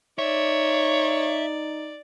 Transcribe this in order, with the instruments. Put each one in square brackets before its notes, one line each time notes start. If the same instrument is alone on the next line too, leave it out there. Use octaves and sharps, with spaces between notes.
[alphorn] D#4 [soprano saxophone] C#5 [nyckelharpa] D5 [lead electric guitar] E5